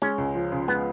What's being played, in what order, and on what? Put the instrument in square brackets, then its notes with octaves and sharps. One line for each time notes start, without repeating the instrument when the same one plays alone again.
[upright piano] G#3 [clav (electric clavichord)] C#4
[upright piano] C#2
F3
C#3
[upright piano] G#3 [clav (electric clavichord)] B3